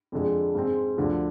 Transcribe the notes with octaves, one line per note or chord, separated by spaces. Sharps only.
F2 D3 G#3
G#2 G#3 C4
D2 D3 F3